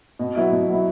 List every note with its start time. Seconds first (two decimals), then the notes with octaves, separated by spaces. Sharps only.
0.19 B2
0.36 F#3 B3 E4
0.51 B2
0.68 F#3 B3 E4